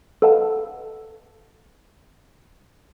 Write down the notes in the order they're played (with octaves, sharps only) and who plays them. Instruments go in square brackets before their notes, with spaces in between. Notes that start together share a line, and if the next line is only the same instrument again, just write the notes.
[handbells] A4 B4 D#5 F5 F#5 A5